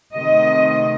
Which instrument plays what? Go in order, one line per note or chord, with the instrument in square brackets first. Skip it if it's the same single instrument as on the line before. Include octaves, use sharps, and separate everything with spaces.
[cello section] C3 D#3 A3 D#5